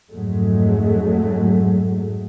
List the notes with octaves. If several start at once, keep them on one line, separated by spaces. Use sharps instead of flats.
F2 G#2 F#3 G#3 A3